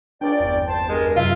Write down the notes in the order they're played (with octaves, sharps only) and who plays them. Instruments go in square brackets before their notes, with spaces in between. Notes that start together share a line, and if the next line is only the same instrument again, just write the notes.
[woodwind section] C#2 D5 [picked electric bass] D4 [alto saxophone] G5
[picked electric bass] G1 E2
[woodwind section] C5 A5
[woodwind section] G2 A#4 [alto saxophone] G#3
[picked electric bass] F#2 C3 [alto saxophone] F4 [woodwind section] E5